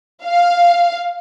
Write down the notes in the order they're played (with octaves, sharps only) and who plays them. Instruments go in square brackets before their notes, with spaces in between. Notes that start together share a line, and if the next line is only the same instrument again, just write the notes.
[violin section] F5